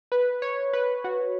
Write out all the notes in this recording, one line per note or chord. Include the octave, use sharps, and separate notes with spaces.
B4
C#5
B4
F#4